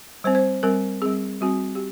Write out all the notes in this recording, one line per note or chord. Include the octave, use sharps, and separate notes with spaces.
G3 C4 C5
C5
G3 C4 A#4
G3 C4 G#4
G3 C4 F#4
G4